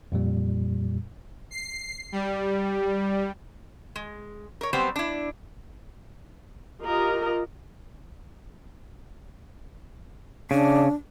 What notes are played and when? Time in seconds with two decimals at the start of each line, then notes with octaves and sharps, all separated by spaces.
0.12 F2 A#2 G3
1.51 C7
2.12 G3
3.96 G#3
4.61 A#4 C#5
4.73 F#3 G3 B3 C4 G4 C5
4.96 D4 E4
6.83 F4 G4 A#4 D#5
10.51 C#3 D4